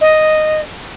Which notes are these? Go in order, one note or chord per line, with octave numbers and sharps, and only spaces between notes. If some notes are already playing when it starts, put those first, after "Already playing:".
D#5